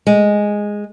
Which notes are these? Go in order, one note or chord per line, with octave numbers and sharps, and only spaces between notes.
G#3